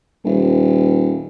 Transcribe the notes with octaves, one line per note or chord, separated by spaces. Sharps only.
D#1